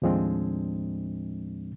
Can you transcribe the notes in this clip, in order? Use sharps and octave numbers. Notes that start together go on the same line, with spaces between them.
D#2 A2 F3 G#3 C4 D4